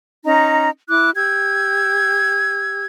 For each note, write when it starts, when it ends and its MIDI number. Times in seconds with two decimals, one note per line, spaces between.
0.24 0.68 61
0.24 0.68 63
0.24 0.68 82
0.88 1.10 64
0.88 1.10 86
0.88 1.10 90
1.16 2.84 67
1.16 2.84 88
1.16 2.84 92